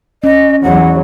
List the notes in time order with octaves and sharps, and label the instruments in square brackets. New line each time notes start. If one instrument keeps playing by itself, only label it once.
[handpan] C#4 [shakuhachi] D#5
[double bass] E2 F#3 [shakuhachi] F#5